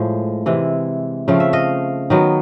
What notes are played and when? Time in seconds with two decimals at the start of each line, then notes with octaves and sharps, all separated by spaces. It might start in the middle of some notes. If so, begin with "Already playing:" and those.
Already playing: A2 F3 G#3
0.46 C3 E3 G#3
1.28 C#3 F3 A3 C4 F5
1.40 E5
1.53 D#5 F5
2.10 D#3 F#3 B3